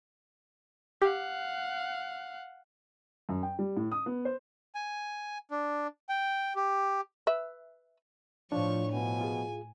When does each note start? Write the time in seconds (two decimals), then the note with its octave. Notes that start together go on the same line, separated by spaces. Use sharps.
1.02 G4 F5 F#5
3.29 F#2
3.43 G5
3.59 G3
3.76 A2
3.92 D#6
4.06 B3
4.25 C5
4.75 G#5
5.51 D4
6.09 G5
6.56 G4
7.27 B4 E5
8.52 A2 F3 D4 C#5 C#6
8.92 B2 F3 B3 G#5
9.21 F4 G#4